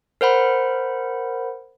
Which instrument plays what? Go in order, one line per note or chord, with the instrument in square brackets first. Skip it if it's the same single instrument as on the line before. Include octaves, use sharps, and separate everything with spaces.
[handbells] A#4 C5 F#5 B5